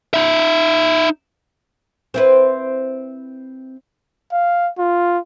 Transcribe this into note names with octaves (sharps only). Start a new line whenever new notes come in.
D#4 E5
C4 E4 B4
F5
F4